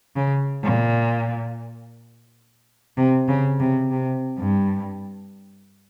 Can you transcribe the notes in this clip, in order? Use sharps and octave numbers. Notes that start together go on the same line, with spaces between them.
C#3
A#2
C3
C#3
C3
C3
G2